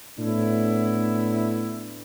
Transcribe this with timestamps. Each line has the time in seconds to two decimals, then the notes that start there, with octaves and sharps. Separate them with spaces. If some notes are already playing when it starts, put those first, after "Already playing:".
0.18 A2 B3 D4 E4